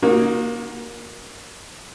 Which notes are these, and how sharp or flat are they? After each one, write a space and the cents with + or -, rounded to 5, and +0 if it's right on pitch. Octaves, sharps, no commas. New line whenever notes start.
A#3 +15 D#4 +0 F#4 -30